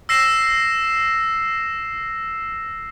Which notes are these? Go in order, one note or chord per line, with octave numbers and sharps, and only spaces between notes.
E6 A#6 C7 E7